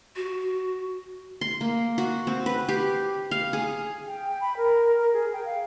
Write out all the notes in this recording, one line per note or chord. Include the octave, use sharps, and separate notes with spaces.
F#4
C6
A#3
F#4
C4
B4
G4
F5
G#4
G5
B5
A#4
A#4
G#4
G5
F5